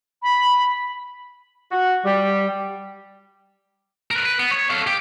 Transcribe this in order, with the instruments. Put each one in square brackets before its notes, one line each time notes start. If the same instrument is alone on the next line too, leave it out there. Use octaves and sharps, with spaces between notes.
[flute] B5
[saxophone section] F#4
G3
[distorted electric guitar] A#4 B4
B4
B3
C#5
A4 F5
G4